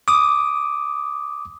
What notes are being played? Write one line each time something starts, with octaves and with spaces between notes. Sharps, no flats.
D6 D#6